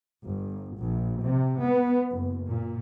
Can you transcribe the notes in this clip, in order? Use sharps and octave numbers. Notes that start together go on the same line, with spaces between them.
G1
A#1
C3
B3
F#1
A#2